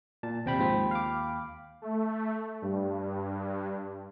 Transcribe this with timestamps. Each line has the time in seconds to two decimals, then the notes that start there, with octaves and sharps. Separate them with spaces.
0.23 A#2 A5
0.46 D#2 C3 G5 B5
0.59 G#2 F3 C4
0.91 F5 D6
1.82 A3
2.62 G2